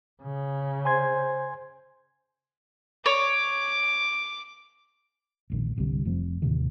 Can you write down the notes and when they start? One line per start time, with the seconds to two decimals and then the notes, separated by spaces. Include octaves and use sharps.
0.22 C#3
0.85 C5 G#5 C6 G#6
3.06 C#5 D6
5.50 E1 A#1 D#3
5.76 G1 C2 D3 G3
6.05 F1 F3 A3 C4
6.42 D#2 A2 C3 D#3